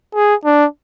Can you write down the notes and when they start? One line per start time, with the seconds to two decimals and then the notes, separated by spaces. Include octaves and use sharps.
0.14 G#4
0.44 D4